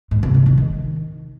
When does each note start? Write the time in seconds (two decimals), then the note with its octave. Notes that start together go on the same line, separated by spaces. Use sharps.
0.11 G#2
0.23 C3
0.34 E2
0.46 D#3
0.58 D#3